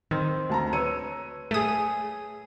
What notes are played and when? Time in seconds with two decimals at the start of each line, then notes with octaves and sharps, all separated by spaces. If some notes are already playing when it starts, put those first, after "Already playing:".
0.11 D#3 C4
0.49 D2 A5 A#5
0.73 B4 C#5 E6 D#7
1.51 A3 G#4 C#5 D#6